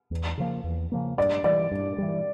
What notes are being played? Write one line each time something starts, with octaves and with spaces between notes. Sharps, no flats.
E2
C#3 F3 A#3
E2
C#3 F3 A#3
G2 D5
E3 G3 D5
G2
E3 G3